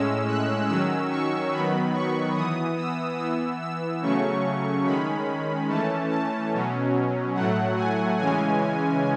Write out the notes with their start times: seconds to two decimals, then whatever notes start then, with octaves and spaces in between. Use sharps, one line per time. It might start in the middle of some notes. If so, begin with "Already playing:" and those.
Already playing: A2 G#3 C#4 E6
0.28 F#6
0.68 D#3 F#3 C#4 E6
1.10 C#6
1.52 D#3 F#3 B3 B5
1.94 C#6
2.35 E3 B3 D#6
2.77 E6
3.19 E3 B3 E6
3.61 E6
4.02 C#3 F#3 A3 C#4 C#6
4.85 D#3 G#3 C#4 B5
5.69 E3 A3 C#4 A5
6.11 A5
6.52 B2 F#3 C#4
7.35 A2 F#3 A3 F#5
7.76 G#5
8.18 C#3 E3 G#3 C#4 G#5